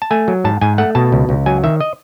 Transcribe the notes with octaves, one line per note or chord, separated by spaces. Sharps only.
A5
A3 G#5
F#3
G#2 A5
G#2 G#5
A3 F#5
B2 A5
C#2
C#2
F#3 G#5
D#3 E5
D#5